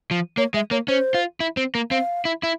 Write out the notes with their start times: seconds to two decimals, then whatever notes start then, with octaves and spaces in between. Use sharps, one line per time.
0.11 F3
0.37 A#3 C#5
0.54 G#3 E5
0.71 A#3 C#5
0.88 C#4 C5
1.14 F4
1.40 E4
1.57 C4
1.75 A#3
1.91 C4 F5
2.25 E4
2.43 E4